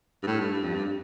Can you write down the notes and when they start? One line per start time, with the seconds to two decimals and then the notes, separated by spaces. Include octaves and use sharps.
0.23 G2
0.27 A2
0.40 G2
0.51 G2
0.63 F2
0.74 G2